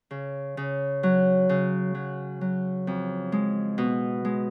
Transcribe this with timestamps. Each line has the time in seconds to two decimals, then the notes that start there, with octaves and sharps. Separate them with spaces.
0.11 C#3
0.57 C#3
1.03 F#3
1.49 C#3
1.95 F#3
2.41 F#3
2.87 F2
3.32 G#3
3.78 B2
4.25 G#3